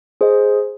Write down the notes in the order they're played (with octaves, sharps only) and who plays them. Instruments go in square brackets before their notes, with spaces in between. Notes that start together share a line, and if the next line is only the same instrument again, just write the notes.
[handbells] G#4 C5 D#5